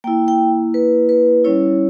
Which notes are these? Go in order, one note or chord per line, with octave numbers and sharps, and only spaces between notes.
A#3 E4 G5
G5
B4
B4
G3 C#4 E4 C#5